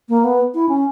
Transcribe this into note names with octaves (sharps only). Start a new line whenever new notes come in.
A#3
B3
E4
C#4